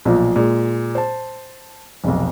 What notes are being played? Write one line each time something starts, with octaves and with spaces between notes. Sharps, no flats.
B1 A#2 F3
A#2 G#3
C5 A5
F1 B1